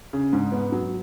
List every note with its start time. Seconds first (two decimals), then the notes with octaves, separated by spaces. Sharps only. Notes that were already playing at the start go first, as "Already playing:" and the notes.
0.13 C#3
0.33 G#2
0.52 B3
0.72 F#3